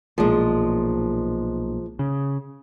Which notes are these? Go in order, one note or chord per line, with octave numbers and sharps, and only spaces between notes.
B1 A#2 F3 G#3
C#3